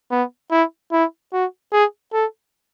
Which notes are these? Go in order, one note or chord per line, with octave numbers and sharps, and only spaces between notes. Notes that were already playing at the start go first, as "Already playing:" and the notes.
B3
E4
E4
F#4
G#4
A4